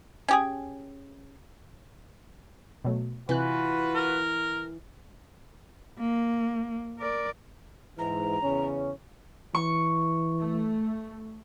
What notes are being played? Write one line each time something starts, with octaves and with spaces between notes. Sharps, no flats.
C#4 G4 G#4
B2 F#3 A3
C3 E3 F4 F#4 B4 F#6
A#4
A#3
A#4 D5
G#2 E3 A#5
E2 C#3 C#4
E3 C#6
A3